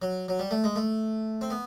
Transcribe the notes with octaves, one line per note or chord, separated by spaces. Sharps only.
F#3
F#3
G3
A3
G#3
A3
C4
B3